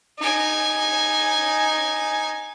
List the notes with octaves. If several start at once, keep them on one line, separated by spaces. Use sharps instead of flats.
D#4 G#5